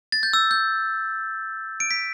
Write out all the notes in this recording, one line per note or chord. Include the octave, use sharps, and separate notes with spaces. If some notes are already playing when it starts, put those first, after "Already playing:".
A6
G6
E6
G6
D7
B6